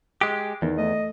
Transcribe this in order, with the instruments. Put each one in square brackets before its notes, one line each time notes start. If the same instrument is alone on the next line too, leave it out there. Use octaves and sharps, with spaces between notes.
[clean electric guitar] G#3 G4
[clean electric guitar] E2 [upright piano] D#3
[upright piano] A3 [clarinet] D#5